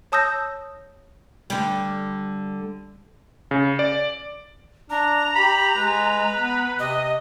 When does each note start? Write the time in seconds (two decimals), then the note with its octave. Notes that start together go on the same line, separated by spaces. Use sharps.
0.12 C#5 A5 D#6 E6 G6 A#6
1.50 D3 G3
3.51 C#3
3.79 D5
4.90 D4 A#5
5.35 G4 B5
5.77 G#3 B4
6.35 B3
6.79 C3 D#5